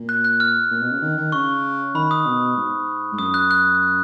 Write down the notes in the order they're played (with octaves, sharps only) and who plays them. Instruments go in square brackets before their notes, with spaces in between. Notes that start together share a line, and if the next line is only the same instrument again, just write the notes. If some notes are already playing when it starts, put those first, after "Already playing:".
Already playing: [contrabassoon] A#2
[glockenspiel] F#6
F#6
F6
[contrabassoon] A#2
B2
C#3
D#3
D#3
[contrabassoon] C#3 [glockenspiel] C#6
[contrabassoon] D#3 [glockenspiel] B5
[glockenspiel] D#6
[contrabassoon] B2
G#2
G#2
[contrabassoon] F#2 [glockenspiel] D#6
[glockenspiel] F#6
F#6